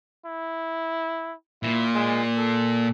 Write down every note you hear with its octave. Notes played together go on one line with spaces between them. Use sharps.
E4
A#2 E4
G#3
A4